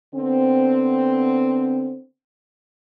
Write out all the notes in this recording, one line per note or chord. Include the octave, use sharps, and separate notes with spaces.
D3 B3 C4